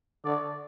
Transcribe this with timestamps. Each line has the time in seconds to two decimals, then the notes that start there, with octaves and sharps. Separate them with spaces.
0.25 D3 D5